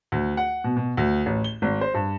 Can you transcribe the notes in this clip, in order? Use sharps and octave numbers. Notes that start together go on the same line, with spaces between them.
D2
F#5
B2
B2
D2
A1
G7
G#1
C5
G2